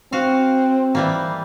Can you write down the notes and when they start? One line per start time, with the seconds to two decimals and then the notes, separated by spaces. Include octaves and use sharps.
0.12 C4 F#4 F5
0.95 E3 G3 A#3